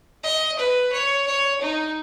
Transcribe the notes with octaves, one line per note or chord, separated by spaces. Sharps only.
D#5
B4
C#5
C#5
D#4